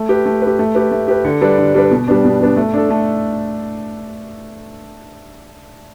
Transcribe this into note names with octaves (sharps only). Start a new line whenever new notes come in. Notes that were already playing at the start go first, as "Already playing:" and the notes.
Already playing: A3
G4 B4
A3
B4
G4
A3
G4 B4
A3
G4 B4
D3
G3 D4 B4
D3
G3 D4 B4
B2
G3 B3 D4
B2
G3 B3 D4
A3
D4 A4
A3